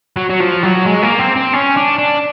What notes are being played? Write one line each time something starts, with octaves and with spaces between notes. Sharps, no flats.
F#3
F#3
F3
F#3
G#3
A#3
C4
C4
C#4
D4
D4